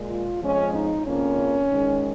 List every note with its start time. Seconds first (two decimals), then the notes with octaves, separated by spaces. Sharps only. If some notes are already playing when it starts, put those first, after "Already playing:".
Already playing: A#2 G#3
0.10 F4
0.42 F2 F3 G#3 C#4
0.74 D#4
1.06 F2 C#3 F3 A#3 C#4
1.70 G#2 D#3 G#3